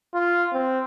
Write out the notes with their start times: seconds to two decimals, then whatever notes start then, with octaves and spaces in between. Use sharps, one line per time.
0.14 F4
0.53 C4